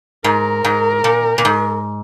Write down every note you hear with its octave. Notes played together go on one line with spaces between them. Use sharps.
G#2 A#4
G#2
A#2
A#2
G#2